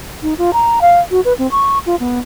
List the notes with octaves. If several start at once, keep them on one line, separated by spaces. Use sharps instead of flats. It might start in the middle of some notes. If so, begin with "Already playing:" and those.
D#4
F4
A#5
F5
F#4
B4
C4
C#6
F4
B3